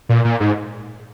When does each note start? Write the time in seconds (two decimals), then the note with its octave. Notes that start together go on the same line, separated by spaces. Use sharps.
0.09 A#2
0.25 A#2
0.40 G#2